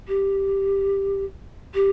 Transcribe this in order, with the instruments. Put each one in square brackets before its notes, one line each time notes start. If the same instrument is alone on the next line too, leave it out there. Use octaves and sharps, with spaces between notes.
[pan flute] G4
G4